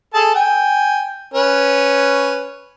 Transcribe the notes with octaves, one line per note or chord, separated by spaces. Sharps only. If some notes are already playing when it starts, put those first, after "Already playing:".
G#4 A4 A5
G5 G#5
C#4 B4